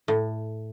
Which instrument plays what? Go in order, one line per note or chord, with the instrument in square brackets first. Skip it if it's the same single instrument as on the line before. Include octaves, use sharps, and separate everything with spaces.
[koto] A2